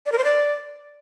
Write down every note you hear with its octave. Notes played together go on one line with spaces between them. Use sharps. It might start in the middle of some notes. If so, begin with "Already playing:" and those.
D5
A#4
C5
D5